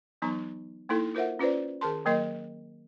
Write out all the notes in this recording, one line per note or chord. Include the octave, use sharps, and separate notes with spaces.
E3 F#3 B3 D#4 A#5
A#3 D#4 E4 A4
F4 A#4 C5 E5 F#5
C#4 F4 B4 C5 D5
D#3 G#4 A#4 A5 C6
D#3 F#3 A#3 A#4 D#5 C6